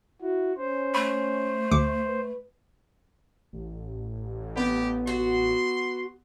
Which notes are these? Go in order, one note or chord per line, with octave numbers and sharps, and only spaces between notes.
E4 F#4
C#4 C5
A3 B5
D2 D6 C#7
B4
A1
B3 G4
F#4 C6